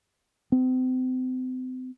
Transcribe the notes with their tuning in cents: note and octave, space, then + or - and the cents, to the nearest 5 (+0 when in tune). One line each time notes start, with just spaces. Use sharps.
C4 -40